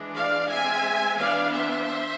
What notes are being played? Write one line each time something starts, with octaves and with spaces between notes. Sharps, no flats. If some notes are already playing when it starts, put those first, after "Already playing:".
Already playing: E3 G#3 D4
D5 F5
G#3 C4 E5 G#5
E3 B3 D4 D5 F5
C5 E5